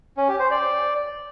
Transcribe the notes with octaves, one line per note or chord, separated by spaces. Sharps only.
C#4
G4
C5
D5